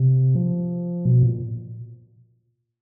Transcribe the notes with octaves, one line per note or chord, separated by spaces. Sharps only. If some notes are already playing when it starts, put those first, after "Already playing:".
Already playing: C3
F3
B2
A#2